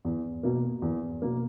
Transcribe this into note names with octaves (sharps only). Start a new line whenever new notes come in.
E2
B2 A#3
E2
B2 A#3